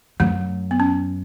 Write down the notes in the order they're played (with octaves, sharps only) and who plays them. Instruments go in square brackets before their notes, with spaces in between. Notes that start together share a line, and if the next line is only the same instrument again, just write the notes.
[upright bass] F#2 [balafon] A3
[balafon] B3
C#4